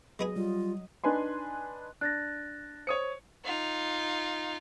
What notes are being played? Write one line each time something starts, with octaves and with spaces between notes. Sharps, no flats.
F#3 G#3 B3 G#4 D#5
G3 F4
D4 D#4 B4 G#5 C6
D4 F#6 A6 A#6
C5 C#5 D#6 C#7
D#4 F4